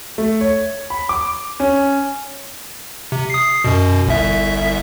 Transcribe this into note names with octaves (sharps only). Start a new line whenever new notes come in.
A3
C#5
B5
D6
C#4
C3
D#6 C7
F#2 B2
G1 C2 E5